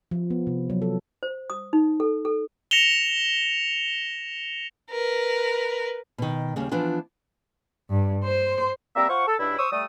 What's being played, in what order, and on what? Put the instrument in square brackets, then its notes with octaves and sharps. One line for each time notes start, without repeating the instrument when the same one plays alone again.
[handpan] F3
B3
C3
F#3
A4
[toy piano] C5
D#6
D#4
A4
A4
[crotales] A#6 C#7 E7 F7 G7
[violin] A#4 B4
[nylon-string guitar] B2 D#3
D#2 C#3 G3
E3 F3 B3 D4 F4
[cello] G2
C5
[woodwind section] G3 A#3 C4 A#4 E5
F4 C5 F#5 C#6
A4
C#2 G2 D4 E4
C5 C#6 D#6 E6
G3 A3 D#6